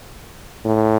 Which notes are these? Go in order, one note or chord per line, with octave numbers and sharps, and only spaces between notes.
A2